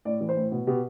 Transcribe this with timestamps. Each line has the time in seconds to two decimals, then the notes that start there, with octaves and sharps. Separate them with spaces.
0.05 A2 D5
0.21 E3
0.29 C5
0.36 A2
0.52 B2
0.67 B2 G4